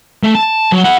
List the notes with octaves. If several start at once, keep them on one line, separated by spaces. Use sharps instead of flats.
A3
A5
F#3
E4 F#5